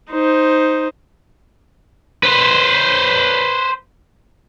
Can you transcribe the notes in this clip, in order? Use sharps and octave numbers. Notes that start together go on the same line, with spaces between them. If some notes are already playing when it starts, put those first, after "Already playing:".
D#4 C5
B4 C5